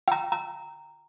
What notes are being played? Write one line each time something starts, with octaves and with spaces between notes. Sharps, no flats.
G5 A#5
A#5